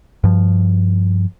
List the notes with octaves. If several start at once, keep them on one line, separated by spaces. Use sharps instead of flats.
G2 F3